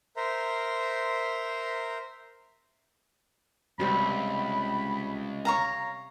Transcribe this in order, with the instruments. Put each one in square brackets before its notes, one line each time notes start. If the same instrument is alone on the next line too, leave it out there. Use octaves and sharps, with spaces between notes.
[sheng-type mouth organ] A#4 C5 E5 A#5 C6
[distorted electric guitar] C#2 [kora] C3 G3 C4 [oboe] B5
[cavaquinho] C#5 F5 A#5